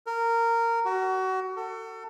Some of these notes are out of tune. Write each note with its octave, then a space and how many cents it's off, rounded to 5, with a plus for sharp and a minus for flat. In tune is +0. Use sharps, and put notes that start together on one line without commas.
A#4 -15
F#4 +25
A4 +30